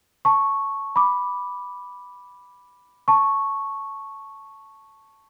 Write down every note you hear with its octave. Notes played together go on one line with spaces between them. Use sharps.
A5 C#6
B5 D6
A5 C#6